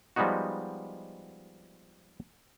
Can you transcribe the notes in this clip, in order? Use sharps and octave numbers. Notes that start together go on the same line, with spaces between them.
F3 G3 G#3 B3 D#4 F#4